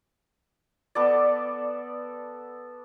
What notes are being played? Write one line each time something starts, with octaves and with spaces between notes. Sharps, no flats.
B3 A4 D5